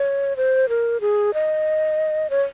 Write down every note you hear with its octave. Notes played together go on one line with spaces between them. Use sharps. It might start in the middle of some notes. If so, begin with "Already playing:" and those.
Already playing: C#5
C5
A#4
G#4
D#5
C#5